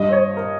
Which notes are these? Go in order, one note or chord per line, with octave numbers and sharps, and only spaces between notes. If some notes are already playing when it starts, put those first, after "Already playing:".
Already playing: G2 G3 D#5
C5
C#5
A#4